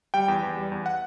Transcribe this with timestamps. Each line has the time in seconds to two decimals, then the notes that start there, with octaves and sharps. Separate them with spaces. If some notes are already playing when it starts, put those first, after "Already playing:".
0.14 G3 G5
0.28 E2
0.43 E2
0.57 G3
0.72 E2
0.86 F#5